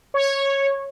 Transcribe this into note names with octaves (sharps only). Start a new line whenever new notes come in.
C#5